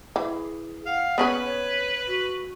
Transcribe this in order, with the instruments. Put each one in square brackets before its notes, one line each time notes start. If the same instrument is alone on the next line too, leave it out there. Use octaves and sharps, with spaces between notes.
[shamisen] E3 [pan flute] G#4
[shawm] F5 [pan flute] F#5
[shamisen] B3 C#4 G#4 [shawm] B4
[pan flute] C#5
F#4